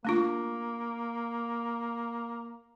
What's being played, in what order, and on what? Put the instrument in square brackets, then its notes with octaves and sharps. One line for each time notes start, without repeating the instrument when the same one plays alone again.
[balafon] A3 D4 F4 [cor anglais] A#3